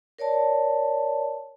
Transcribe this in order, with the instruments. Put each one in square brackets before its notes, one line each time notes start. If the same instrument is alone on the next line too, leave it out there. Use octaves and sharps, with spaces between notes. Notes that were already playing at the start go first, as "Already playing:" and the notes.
[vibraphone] A#4 C#5 D5 A5